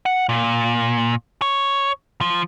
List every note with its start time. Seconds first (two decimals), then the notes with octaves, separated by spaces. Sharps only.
0.06 F#5
0.29 A#2
1.42 C#5
2.21 F3